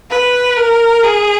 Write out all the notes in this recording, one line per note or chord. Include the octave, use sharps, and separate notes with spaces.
B4
A#4
G#4